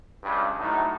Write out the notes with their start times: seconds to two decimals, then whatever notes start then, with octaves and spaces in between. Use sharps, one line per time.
0.23 C#2 G2
0.59 A2 F#3 D#4